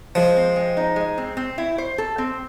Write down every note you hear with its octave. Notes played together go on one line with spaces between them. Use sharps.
F3 G#3
C4
G#3
D#4
G#3
C4
C4
E4
C5
A4
C4